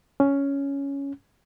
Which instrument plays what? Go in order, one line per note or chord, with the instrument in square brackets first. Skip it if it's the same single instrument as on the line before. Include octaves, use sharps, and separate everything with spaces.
[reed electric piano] C#4